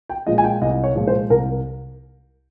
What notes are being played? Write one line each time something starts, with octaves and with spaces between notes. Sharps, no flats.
G5
A#2 F3 G#3 D#5
G#5
G5
C2 D#5
C#5
A#2 F3 G#3
C5
C2 A#4